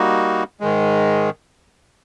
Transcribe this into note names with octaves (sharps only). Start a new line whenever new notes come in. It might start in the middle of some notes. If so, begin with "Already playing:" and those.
Already playing: G3 A#3 D#4 F#4
G#2 D#3 G#3